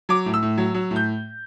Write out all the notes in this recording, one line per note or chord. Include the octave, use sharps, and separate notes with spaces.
F#3 D6
A2
E6
A2
F#3
F#3
A2
G6